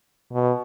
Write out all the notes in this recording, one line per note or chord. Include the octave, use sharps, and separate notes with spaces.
B2